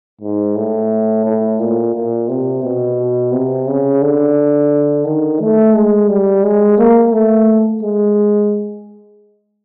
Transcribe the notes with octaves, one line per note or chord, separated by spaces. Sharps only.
G#2
A2
A2
A#2
A#2
C3
B2
C3
C#3
D3
D#3
A3
G#3
G3
G#3
A#3
A3
G#3